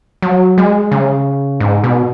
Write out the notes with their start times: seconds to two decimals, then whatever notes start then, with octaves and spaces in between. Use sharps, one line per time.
0.22 F#3
0.58 G#3
0.91 C#3
1.60 G#2
1.84 B2